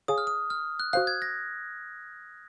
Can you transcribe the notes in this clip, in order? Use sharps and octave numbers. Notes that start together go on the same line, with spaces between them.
G#4 C#5 F5 G#5 D#6
F6
D#6
F6
F#6
F#4 C5 F5 F#6
G#6
A#6